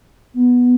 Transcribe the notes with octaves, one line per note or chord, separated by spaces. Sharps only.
B3